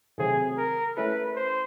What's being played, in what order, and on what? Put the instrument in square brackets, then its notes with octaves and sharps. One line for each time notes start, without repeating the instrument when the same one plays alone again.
[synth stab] C3 D#3 F#3 A3 C4 [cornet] G#4
[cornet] A#4
[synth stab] A3 C#4 E4 A4 [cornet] B4
[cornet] C5